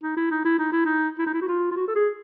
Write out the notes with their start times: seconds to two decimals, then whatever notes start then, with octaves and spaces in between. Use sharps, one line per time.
0.03 D#4
0.17 E4
0.31 D#4
0.45 E4
0.59 D#4
0.72 E4
0.85 D#4
1.19 E4
1.26 D#4
1.34 E4
1.41 F#4
1.48 F4
1.71 F4
1.76 F#4
1.88 A4
1.95 G#4